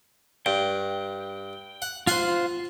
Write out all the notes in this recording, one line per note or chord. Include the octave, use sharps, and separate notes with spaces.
G2 G5
F#5
F4 C5 F#5 G#5 C6